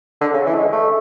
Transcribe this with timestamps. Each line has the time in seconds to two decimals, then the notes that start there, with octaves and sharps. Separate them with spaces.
0.21 D3
0.34 C#3
0.46 E3
0.55 A3
0.59 G#3
0.73 A3